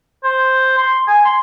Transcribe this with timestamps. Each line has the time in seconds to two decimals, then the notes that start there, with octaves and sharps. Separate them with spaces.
0.24 C5
0.78 C6
1.08 G#5
1.25 C6